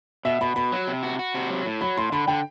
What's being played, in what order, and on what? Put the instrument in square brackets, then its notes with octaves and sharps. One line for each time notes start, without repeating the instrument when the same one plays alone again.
[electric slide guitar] B2 [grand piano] E5
[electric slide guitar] B2 [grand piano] B5
[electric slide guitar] B2 [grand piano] B5
[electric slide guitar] F#3
C3
F#4
F#4
C3
F#3
A2
[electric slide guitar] F#3 [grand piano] B5
[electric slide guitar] A2 [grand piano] C6
[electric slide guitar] D3 [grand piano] B5
[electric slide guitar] D3 [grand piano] G5